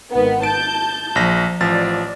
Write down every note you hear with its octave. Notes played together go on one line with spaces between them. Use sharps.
G#1 D#3 B3
A5 G6 D7
A#1 F3 A#6
A1 F3 D5 A6